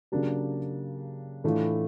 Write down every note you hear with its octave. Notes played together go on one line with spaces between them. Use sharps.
C#3 F#3 A#3 D4 G4
A2 E3 A3 D4 F4